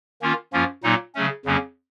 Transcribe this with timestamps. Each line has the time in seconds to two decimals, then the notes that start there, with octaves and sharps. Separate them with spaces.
0.22 D#3 A#3 C#4 F4
0.53 F#2 F3 A#3 C#4 F4
0.83 A#2 F#3 A#3 D#4
1.15 C#3 F#3 A3 C#4
1.45 F2 C#3 F#3 A#3 C#4